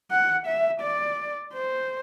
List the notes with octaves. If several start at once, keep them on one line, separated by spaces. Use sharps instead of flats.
F#5
E5
D5
C5